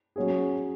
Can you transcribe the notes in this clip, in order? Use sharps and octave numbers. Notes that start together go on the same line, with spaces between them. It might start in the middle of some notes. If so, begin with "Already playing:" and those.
F#3 C#4 G#4